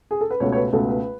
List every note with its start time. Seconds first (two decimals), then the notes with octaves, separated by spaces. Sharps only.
0.11 G#4
0.21 A4
0.31 B4
0.40 C#2 B2 A3 C#5
0.52 C#5
0.56 B4
0.73 C#2 B2 A3 A4
0.89 B4